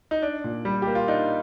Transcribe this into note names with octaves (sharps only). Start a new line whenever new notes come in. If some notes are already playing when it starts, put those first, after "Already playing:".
D#4
D4
A#2
G3
A#3 G4
F4
D4 D#4